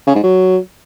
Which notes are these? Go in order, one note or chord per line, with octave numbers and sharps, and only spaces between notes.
C#3
G#2
F#3